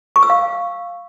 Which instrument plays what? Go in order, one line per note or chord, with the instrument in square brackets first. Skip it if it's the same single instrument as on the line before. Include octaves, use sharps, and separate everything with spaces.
[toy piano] C#6
E6
F5